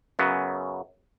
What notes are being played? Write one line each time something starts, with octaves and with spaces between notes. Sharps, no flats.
F#2 C#3 F#3 B3